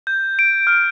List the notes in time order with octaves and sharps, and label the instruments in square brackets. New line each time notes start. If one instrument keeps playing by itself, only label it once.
[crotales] G6
D7
F6